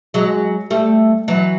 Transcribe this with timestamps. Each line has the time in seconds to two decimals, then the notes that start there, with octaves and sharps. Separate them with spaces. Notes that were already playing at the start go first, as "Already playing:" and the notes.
0.14 F#3 G#3
0.70 G3 A3
1.28 E3 F#3